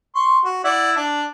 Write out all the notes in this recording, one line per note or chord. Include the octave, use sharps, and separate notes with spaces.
C6 C#6
F#4
E4 D5 F#5
D4